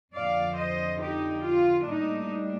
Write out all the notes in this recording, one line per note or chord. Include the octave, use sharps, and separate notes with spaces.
F2 D3 F3 D5 F5
C5 D#5
D#4 G4
F4
A2 G3 A#3 D4 D#4